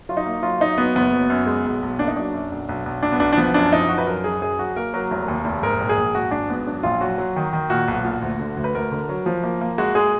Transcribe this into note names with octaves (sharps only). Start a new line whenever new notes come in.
F#3 F4
D#4
A#3
F#3 F4
F#3 D#4
F#3 B3
F#1 B3
F#3
F#2
G#3
B1
B1
A#3 D4
D#4
F#3 D4
F#2
B1
B1
B1
B1 D4
B3
B1 D4
D4
F3 B3
F#2 D4
F3 D#4
F#2 F#4
B4
F#3 A#4
F#2 G#4
F#2 G#4
F#3 F#4
A#3 A#4
F#3 A#4
F1
D#2
F1
G#2 A#4
A#1
G#4
A#1
G#1 F#4
G#1 D4
G#1 B3
F#3 D4
A#1 F4
F#3 F#4
F#3
D#3
D#3
A#2 F#4
B1
A#2
D2
D3
D2
B4
D2 A#4
D3
F#3
F3
A#3
A#3
G#3 F#4
G#3 G#4